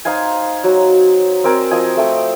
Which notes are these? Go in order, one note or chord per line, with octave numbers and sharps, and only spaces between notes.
D#4 C5 F5 G#5
F#3
C4 A#4 D5 G#5
F3 D#5 G#5
A3 G5